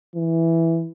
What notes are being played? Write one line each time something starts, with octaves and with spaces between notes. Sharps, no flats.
E3